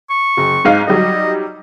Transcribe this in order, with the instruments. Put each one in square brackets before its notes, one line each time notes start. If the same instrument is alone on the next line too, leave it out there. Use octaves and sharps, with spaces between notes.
[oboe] C#6
[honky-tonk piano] F#1
G#2 D#4 F5
[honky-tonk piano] F#3 G3 D#4 [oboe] D#5